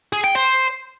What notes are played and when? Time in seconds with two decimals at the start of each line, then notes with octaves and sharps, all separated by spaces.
0.13 G#4
0.24 G5
0.35 C5